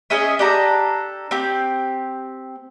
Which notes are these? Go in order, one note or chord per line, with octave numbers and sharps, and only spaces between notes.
C#4 G#4 D#5 E5
D4 G4 A4 A#5
C4 G4